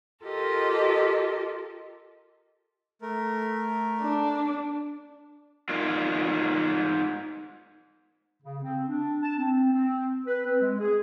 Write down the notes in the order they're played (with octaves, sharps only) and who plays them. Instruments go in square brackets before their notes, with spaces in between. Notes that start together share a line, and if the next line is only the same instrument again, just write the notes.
[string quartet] F4 G4 A4 A#4 D#5
[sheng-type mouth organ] A3 A#4
[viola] D4
[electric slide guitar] G#3 D#4 F4 A#4 D5 F5
[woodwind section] C#3
C4
D4
A5
C4
C4
B4
C4
G#3
G#4